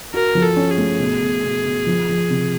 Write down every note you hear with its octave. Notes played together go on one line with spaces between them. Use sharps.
F#4 A#4
F3
A4
C#4
G#4
A3
B2
B2
B2
B2
F3
F3
C3